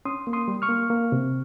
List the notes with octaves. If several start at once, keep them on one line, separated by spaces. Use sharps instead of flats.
C#4 C6 D#6
A#3
C6 D#6
G3
C#6 F6
A#3
A#3
C3